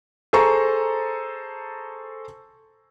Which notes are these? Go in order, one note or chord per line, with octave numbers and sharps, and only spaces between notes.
G#4 A4 C5 A#5 C#6